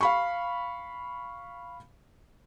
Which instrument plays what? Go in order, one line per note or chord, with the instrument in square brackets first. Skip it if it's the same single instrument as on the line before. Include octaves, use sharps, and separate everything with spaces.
[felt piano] F5 B5 C#6